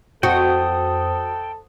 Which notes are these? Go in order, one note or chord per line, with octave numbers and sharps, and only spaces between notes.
F2 F#4 A4 C5 G5 D#6